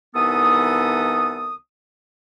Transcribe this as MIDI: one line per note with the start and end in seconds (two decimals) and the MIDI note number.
0.15 1.55 36
0.15 1.55 52
0.15 1.55 59
0.15 1.55 63
0.15 1.55 69
0.15 1.55 87